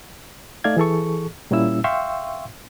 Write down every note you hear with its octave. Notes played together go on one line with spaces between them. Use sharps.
A3 D#4 D5 F5 G#6
E3 G#4 A4 C#6
A#2 G3 A#3 C#4 E4 E6
E5 F5 G5 C6 C#6 E6